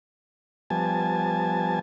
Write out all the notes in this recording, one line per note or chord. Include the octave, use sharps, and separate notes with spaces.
F3 G3 B3 G#5 A5